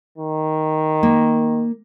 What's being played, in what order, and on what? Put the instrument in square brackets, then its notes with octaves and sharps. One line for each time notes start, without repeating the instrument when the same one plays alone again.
[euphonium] D#3
[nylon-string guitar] A#3